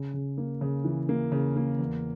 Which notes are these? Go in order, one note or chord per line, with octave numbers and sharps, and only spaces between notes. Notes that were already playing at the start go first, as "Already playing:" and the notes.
Already playing: C#3
C#3
A#3
C#3
E3
A#3
C#3
A#3
E2